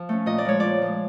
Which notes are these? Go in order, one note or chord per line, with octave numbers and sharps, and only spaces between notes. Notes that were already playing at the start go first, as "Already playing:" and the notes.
Already playing: F3
A3 C#4
A#2 D#5
D5
F3 G#3 C#5
A#2 D5
F3 G#3